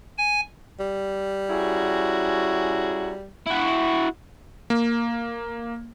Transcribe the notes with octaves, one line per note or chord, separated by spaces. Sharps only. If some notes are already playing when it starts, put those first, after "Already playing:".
G#5
G3
C#4 E4 F#4 G#4 A#5
E4 F#4
A#3